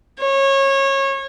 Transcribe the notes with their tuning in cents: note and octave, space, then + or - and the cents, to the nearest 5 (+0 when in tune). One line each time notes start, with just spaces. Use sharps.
C#5 -25